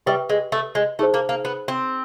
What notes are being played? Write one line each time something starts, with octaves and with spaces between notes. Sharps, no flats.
G3 G4 B4 E5
G#3
A3
G#3
A3 D#4 G#4 C5
A#3
A#3
B3
C4